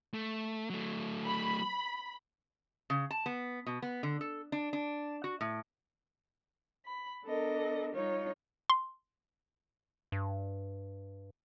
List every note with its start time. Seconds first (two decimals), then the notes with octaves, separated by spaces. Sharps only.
0.14 A3
0.70 F#3 A3
1.25 B5
2.90 C#3
3.11 A5
3.26 B3
3.66 B2
3.82 B3
4.03 D3
4.21 A4
4.52 D4
4.73 D4
5.24 F#4
5.41 A2
6.85 B5
7.23 B3 D4 A4 A#4 D#5
7.95 G3 D#4 F4 C#5
8.70 C6
10.12 G2